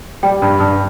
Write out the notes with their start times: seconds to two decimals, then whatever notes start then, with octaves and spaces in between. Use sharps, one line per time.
0.23 G3 G5
0.42 G2
0.60 G2